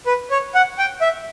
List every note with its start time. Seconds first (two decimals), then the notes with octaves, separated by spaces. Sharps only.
0.06 B4
0.31 C#5
0.55 F#5
0.78 G5
1.01 E5